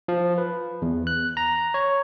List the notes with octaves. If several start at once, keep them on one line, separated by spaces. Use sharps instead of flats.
F3
B4
E2
F#6
A#5
C#5